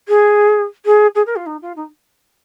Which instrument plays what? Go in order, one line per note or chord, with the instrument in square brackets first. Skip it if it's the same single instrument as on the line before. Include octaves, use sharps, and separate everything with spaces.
[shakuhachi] G#4
G#4
G#4
A#4
F4
D#4
F4
D#4